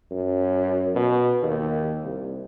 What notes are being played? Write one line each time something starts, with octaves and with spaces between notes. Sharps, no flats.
F#2
B2
D#2
C2